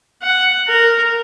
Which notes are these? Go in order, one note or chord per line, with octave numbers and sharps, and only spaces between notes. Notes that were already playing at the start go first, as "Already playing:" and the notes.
F#5
A#4